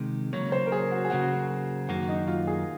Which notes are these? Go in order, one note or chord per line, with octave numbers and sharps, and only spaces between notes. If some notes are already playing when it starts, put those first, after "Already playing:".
Already playing: C3 D#3 G#3
C#3 F#3 A#3 C#5
C5
A#4
G#4
F#4
G#4
C#3 F#3 A#3 F#4
F#2 D#3 A#3 F#4
D#4
F4
G#4